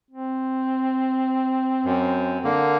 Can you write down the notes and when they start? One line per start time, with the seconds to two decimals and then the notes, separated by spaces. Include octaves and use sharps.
0.10 C4
1.85 F#2
2.44 D3 A#3